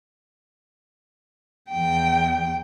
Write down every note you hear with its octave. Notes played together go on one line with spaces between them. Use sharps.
E2 G5